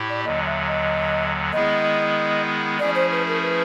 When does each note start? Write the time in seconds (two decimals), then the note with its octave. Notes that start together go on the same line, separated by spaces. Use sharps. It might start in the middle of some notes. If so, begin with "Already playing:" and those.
Already playing: A2 E4 G4
0.09 D5
0.24 D#2 D3 F#3 D#5
0.46 E5
0.67 D#5
1.52 D#3 G#3 B3 E4 G#4 D#5
2.79 F3 A3 C#4 E4 G#4 D5
2.95 C5
3.12 B4
3.27 A#4
3.43 B4